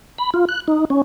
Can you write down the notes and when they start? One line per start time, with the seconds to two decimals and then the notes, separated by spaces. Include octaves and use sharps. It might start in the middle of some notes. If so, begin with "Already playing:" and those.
0.18 B5
0.34 F4
0.49 F#6
0.68 D#4
0.90 C#4